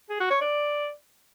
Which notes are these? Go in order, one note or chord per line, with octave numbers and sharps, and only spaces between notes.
G#4
F#4
C#5
D5